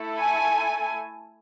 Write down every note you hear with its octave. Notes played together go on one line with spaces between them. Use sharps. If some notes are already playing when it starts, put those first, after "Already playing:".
Already playing: A3 E4 A4
G#5